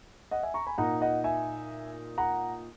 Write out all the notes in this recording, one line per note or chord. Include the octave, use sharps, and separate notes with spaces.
D#5 F#5
E5 G#5
A#5 C#6
G#5 B5
A#2 A#3 D#4 F#5 A#5
D#5 F#5
E5 G#5
F#5 A#5